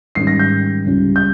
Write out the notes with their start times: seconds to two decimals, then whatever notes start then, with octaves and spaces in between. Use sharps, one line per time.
0.15 G#2 D#3 G3 C#4 C7
0.27 A#6
0.39 G6
0.86 C#2 C#3 G3 C#4
1.16 G6